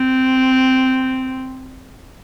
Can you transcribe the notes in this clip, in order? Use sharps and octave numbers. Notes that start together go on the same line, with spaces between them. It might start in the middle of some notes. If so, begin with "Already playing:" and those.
Already playing: C4